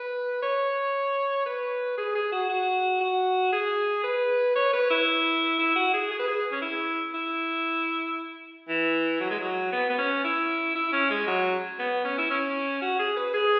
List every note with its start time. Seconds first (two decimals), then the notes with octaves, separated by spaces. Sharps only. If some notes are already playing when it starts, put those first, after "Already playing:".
Already playing: B4
0.42 C#5
1.46 B4
1.98 G#4
2.15 G#4
2.32 F#4
2.49 F#4
3.01 F#4
3.53 G#4
4.04 B4
4.56 C#5
4.73 B4
4.90 E4
5.59 E4
5.76 F#4
5.93 G#4
6.11 G#4
6.20 B4
6.28 G#4
6.52 C#4
6.62 E4
7.14 E4
8.69 E3
9.21 F#3
9.31 G#3
9.39 F#3
9.72 B3
9.90 B3
9.98 C#4
10.24 E4
10.75 E4
10.93 C#4
11.10 G#3
11.27 F#3
11.79 B3
12.05 C#4
12.18 E4
12.31 C#4
12.82 F#4
12.99 G#4
13.17 B4
13.34 G#4